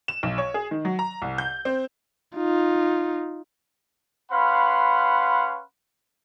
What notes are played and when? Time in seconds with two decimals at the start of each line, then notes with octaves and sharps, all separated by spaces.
0.08 E7
0.23 B1
0.38 C#5
0.54 G#4
0.71 D#3
0.85 F#3
0.99 A#5
1.22 C2
1.38 G6
1.65 C4
2.36 D#4 F4
4.31 C#4 B4 F5 F#5 B5 C6